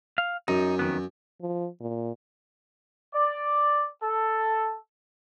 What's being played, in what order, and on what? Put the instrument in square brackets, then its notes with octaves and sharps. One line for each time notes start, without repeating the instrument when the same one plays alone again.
[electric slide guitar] F5
[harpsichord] F#2 [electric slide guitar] D#4
[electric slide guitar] F2 D#3 B3
[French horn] F3
A#2
[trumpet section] D5
A4